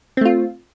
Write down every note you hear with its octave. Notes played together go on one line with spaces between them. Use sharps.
A3 C4 F4